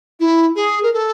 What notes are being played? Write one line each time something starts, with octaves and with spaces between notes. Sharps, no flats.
E4
G#4
A#4
A4